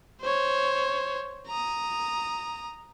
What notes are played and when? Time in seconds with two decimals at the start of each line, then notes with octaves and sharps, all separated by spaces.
0.21 C5 C#5
1.48 A#5 D#6